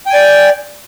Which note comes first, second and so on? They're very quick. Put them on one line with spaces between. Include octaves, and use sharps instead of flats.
G5 G#5 D5